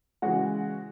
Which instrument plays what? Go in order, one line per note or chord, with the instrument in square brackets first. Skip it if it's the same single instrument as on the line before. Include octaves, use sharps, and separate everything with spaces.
[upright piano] C#3 E3 G#3 F#4 F#5